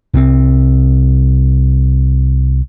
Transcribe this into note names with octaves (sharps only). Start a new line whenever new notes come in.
C2 C4